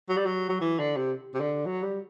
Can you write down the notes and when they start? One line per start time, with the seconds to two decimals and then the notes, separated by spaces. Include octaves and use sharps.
0.09 F#3
0.17 G3
0.26 F#3
0.49 F#3
0.61 E3
0.79 D3
0.97 C3
1.35 C3
1.41 D3
1.66 F#3
1.83 G3